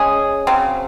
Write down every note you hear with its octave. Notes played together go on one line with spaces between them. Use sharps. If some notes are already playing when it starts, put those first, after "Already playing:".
Already playing: G#3 C#4 G#4
C#3 F#3 C4